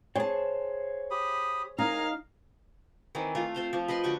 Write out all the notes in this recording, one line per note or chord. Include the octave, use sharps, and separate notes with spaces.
G#4 C5 C#5 G5 A5
G4 B5 D#6
D#4 A#4 F5 G#5 A#5
D#3 E3 C4
A3 F4
C4 C5 F5
F3
B4 D#5 G5 C6
D3 F#4 G4 C#6